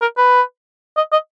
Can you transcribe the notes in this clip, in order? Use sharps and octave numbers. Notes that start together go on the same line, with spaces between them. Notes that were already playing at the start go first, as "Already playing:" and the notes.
A#4
B4
D#5
D#5